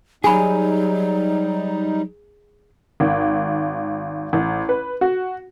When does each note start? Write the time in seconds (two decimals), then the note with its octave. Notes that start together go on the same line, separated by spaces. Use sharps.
0.24 F#3 G3 D#4 G#4 G#5 B5
3.00 G#1
4.33 A1
4.69 B4
5.01 F#4